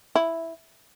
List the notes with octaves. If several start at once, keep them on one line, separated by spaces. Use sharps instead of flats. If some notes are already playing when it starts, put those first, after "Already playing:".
E4